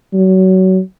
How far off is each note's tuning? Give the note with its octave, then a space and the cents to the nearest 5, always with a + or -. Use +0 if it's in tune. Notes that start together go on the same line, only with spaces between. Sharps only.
F#3 +25